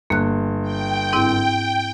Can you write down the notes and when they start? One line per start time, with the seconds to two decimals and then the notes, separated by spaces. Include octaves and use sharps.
0.10 G1 A#3 F#6
0.63 G5
1.13 G#2 C4 E4